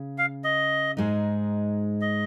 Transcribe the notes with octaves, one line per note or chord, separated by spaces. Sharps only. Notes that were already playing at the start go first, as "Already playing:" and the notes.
Already playing: C#3 G#4
F5
D#5
G#2 G#3 D#4
D#5